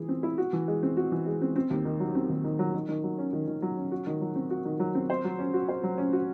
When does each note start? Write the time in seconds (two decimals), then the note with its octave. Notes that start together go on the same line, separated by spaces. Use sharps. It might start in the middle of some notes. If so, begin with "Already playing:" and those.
Already playing: E3 G#4
0.09 C4
0.23 E4
0.38 F#4
0.53 E3
0.68 G#3
0.83 C4
0.97 F#4
1.12 E3
1.26 G#3
1.41 C4
1.56 C4
1.71 D#2
1.85 D#3
2.00 F#3
2.15 C4
2.30 D#2
2.44 D#3
2.59 F#3
2.74 D#3
2.89 D#3
3.03 F#3
3.18 C#4
3.33 D#3
3.47 D#3
3.62 F#3
3.77 C#4
3.92 F#4
4.07 D#3
4.21 F#3
4.36 C4
4.50 F#4
4.65 D#3
4.80 F#3
4.95 C4
5.10 C5
5.24 F#3
5.39 C#4
5.54 F#4
5.69 C5
5.83 F#3
5.98 C#4
6.13 F#4